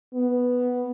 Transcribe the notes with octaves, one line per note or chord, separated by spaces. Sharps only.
B3